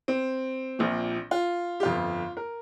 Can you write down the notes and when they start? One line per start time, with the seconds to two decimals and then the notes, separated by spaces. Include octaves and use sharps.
0.08 C4
0.79 A#1 A#2 F3
1.31 F4
1.80 G4
1.83 G1 F2 F3 F4
2.37 A#4